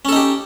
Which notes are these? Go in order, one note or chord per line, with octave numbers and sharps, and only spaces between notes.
C#4 D#4 G4 A4